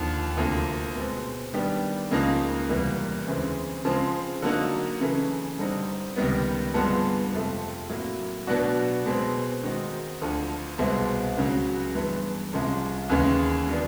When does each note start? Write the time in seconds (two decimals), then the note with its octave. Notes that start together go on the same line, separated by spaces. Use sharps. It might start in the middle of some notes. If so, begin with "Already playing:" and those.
Already playing: D#2 D3 F3
0.37 D2 C3 F3 A#3
0.95 B2 G#3 C4
1.54 D#3 G3 B3 D4 G4
2.11 C#2 C#3 F3 A#3 D#4
2.69 E2 C3 E3 G3 A#3
3.28 D2 C#3 E3 G#3 C4
3.85 C#3 F3 G#3 C4
4.42 D3 F#3 A#3 D#4
5.01 C#3 E3 A3 C#4
5.58 G2 D3 G3 C4 D#4
6.16 C#2 C3 D#3 G3 B3
6.74 G2 D3 F3 G#3 B3
7.32 F2 C3 F3 A3
7.89 A2 F#3 A#3
8.47 B2 F#3 B3 D4 F#4
9.06 B2 G#3 C4
9.63 D#3 G#3 C4 D#4 F#4
10.22 D2 D3 F3
10.78 C2 B2 G#3 C4
11.37 C#2 C#3 F#3
11.94 G2 E3 G#3 B3
12.53 C2 C3 F3 G#3 C#4
13.10 D#2 C#3 E3 G#3 C#4
13.68 D#3 F#3 B3 D4